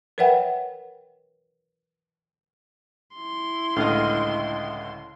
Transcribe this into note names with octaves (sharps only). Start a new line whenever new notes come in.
A#4 B4 C#5 E5 F#5 G5
E4 C6
C#2 A2 D3 D#5 F5